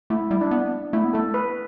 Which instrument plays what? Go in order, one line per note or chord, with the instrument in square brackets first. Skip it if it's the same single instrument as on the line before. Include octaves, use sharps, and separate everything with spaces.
[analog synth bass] A3 [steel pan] E4
[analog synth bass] G3 [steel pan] E4
[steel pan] D4
[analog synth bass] B3
[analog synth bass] A3 [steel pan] E4
[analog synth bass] B3
[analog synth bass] A3 [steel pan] A4
[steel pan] B4